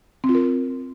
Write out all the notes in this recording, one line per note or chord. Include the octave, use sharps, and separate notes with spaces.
C4
F4
A#4